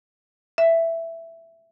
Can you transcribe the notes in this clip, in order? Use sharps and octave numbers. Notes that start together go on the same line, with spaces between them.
E5